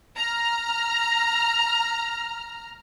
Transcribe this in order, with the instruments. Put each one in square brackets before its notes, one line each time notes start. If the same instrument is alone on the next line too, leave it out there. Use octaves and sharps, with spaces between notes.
[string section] A#5 F6